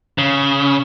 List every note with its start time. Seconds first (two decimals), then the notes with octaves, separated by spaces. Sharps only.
0.18 C#3